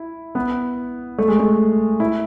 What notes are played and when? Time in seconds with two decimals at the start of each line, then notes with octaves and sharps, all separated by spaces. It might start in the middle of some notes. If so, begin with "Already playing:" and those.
Already playing: E4
0.35 B3
1.19 A3
1.28 G#3
1.40 A3
2.00 E4